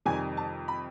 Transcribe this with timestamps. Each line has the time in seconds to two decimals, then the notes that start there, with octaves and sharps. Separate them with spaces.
0.05 F2 C3 D#3 G3 G#5
0.37 A5
0.68 B5